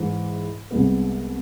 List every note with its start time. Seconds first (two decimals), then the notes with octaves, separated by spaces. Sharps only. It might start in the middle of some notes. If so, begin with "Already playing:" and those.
Already playing: G#2 E3 G#3
0.71 C2 C3 G#3 B3